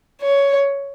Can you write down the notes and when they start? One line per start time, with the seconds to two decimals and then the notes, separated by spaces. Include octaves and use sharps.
0.22 C#5